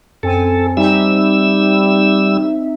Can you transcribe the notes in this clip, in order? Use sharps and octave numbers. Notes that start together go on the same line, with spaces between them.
F#2 C4 A4 G#5
G3 C4 D#4 E5 E6